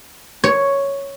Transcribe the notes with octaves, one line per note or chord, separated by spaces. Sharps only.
C#5